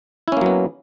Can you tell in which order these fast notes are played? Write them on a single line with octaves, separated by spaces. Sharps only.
E4 C#4 A#3 F#3 B3